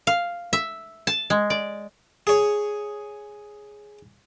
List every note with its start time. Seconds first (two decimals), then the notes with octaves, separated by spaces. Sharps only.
0.07 F5
0.53 E5
1.07 A5
1.30 G#3
1.50 D5
2.27 G#4 C#5